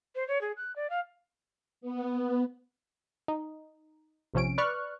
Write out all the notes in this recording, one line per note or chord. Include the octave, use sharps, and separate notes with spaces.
C5
C#5
G#4
F#6
D5
F5
B3
D#4
A#1 C3 F3 C#4 D7
B4 D5 C#6 F6 F#6